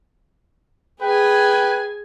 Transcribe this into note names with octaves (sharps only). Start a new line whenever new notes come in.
G#4 B4 G5 G#5